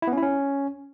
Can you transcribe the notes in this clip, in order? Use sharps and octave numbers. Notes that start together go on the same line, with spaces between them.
E4
B3
C#4
E4
C#4